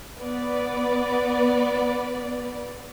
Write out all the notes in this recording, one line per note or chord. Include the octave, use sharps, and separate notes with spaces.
B3 B4 D5